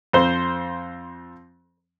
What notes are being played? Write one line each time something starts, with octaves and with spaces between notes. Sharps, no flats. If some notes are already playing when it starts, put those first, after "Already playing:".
F2 C5